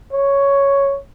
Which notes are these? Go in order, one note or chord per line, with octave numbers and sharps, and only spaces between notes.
C#5